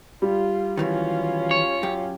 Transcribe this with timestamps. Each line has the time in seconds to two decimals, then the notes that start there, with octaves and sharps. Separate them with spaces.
0.22 G3 F4
0.77 D#3 E3 F#3 C#4 F4
1.51 C#5
1.83 F#2 G4